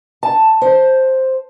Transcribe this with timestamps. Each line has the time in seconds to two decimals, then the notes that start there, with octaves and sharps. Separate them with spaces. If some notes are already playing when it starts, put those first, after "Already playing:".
0.23 A5
0.61 C5